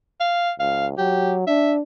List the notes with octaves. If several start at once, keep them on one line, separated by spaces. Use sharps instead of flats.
F5
C#2 F5
F#3 G4
D4 E5